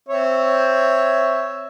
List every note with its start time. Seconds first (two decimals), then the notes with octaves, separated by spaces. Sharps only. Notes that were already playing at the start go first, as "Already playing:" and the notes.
0.09 C4 C#5 E5